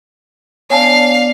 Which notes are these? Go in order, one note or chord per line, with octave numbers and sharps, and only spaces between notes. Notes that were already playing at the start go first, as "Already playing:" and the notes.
B3 D4 C#5 D5 F5 G#5 A5